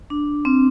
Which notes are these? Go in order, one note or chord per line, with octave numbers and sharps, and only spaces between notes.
D4
C4